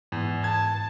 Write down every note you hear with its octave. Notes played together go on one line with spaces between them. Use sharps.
E2 G#2
A5 G#6